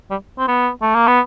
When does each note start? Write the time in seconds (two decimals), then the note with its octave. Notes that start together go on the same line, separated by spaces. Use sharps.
0.11 G3
0.38 C4
0.48 B3
0.82 A3
0.95 A#3
1.08 B3